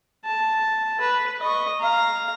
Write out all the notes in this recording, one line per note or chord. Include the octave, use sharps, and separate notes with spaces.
A5
B4
D#5 C#6
F5 A#5